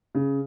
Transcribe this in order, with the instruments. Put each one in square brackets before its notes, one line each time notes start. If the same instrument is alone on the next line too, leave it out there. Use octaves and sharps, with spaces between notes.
[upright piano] C#3